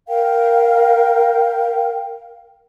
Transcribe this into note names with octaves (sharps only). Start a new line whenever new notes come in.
A#4 F5 G5